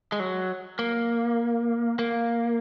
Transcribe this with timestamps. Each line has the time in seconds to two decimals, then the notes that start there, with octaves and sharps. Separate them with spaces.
0.12 G#3
0.20 F#3
0.79 A#3
1.99 A#3